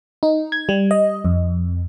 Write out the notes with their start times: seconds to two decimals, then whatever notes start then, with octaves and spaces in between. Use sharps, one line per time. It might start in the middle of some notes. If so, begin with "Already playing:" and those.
0.23 D#4
0.52 G#6
0.69 G3
0.91 D#5
1.25 F2